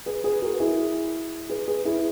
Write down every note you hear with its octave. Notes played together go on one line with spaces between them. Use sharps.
G#4 B4
G#4 B4
F#4 A#4
E4 G#4
G#4 B4
G#4 B4
E4 G#4